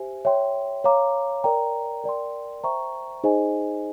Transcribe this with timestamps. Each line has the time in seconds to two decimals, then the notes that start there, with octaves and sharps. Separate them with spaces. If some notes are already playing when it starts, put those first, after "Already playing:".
Already playing: G4 C5 E5 G#5
0.25 C#5 E5 G5 C6
0.84 C#5 F5 A#5 D6
1.44 A#4 D5 G5 A#5
2.04 A#4 D5 G5 C6
2.64 C5 E5 G5 A#5 C#6
3.24 D#4 G#4 C5 D#5 G#5